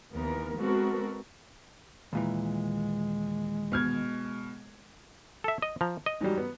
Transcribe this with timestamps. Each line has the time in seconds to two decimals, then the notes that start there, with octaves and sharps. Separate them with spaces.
0.13 D#2 E3 B3 A#4
0.59 G#3 B3 C4 F#4 A4 A#4
2.13 D#2 A#2 E3 G#3
3.72 B2 F6 G#6
5.44 A4 E5
5.62 D#5
5.81 F3 A#5
6.06 D#5
6.21 G#2 F#3 G3
6.38 B3